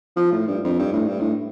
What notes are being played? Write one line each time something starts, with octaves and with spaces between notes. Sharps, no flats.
F3
A2
G2
F2
G2
A2
G2
A2